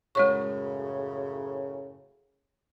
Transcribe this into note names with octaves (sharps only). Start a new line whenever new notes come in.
F#2 A2 C#3 G#3 C#5 C#6